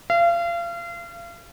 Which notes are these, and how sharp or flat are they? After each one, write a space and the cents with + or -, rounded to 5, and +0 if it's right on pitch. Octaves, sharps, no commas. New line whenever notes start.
F5 -35